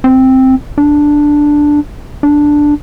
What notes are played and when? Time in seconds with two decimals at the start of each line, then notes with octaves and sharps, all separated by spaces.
0.04 C4
0.78 D4
2.23 D4